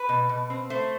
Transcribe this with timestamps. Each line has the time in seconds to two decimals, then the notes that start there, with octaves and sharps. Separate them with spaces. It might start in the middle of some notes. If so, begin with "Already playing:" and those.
Already playing: B4
0.09 B2
0.29 B2
0.50 C4
0.70 A3 C5